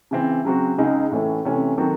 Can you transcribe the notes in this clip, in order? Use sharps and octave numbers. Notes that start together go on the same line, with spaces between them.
C#3 E3 C4
C#3 F#3 C4 F#4
C#2 C#3 G#3 D#4 G#4
A2 E3 A3 C#4 E4
C3 E3 A3 C#4
D#3 F#3 C4 F#4 A4